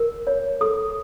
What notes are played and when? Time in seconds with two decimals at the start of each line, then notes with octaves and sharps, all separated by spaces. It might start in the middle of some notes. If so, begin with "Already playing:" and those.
Already playing: A#4
0.27 C#5
0.61 A4 D#6